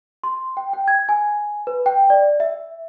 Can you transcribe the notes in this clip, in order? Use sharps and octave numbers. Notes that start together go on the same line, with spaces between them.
C6
G5
G5
G#6
G#5
B4
G5
D5
E5